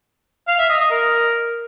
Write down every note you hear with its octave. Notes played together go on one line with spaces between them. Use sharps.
F5
E5
D#5
D#5
A#4